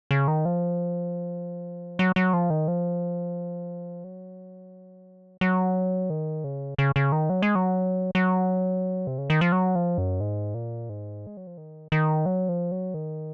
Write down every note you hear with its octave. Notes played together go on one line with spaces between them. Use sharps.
C#3
D#3
F3
F#3
F#3
F3
D#3
F3
F#3
F#3
D#3
C#3
C#3
C#3
D#3
F#3
G#3
F#3
F#3
C3
C#3
D#3
F3
F#3
F3
F#2
G#2
A#2
G#2
G#3
F#3
F3
D#3
D#3
F#3
F3
F#3
D#3